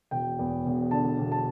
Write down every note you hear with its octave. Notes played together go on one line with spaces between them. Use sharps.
E1 G5
E2
E1
D3 A5
E1
A5